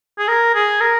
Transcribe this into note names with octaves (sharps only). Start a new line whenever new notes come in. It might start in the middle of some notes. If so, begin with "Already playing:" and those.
G#4
A#4
G#4
A#4